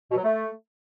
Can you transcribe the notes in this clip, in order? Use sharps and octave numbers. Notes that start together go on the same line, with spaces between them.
B2
F#3
A3